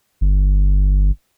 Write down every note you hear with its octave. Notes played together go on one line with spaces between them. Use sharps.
G1